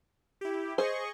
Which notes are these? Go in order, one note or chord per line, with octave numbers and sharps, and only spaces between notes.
E4 G4
G#4 C5 D#5 C#6